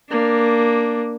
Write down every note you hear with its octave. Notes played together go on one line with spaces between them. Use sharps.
A#3 D4